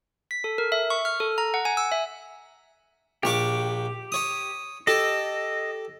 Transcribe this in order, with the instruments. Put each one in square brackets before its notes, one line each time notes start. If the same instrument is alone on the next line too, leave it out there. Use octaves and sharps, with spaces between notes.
[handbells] B6
A4
A#4
E5
C#6
F6
A4
A#5
F#5
G#5
E6
E5
[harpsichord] A#1 C#6 D6 [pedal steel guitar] G4
[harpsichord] C#5 D#6
[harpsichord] G4 A4 [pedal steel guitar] D#5